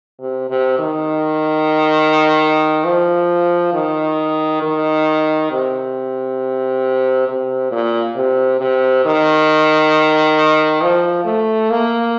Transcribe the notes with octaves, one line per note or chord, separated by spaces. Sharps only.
C3
C3
D#3
F3
D#3
D#3
C3
C3
A#2
C3
C3
D#3
F3
A3
A#3